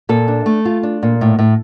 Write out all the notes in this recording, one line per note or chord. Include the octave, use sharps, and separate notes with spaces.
A#2 A4
D4
A3
F4
D4
A#2
A2
A2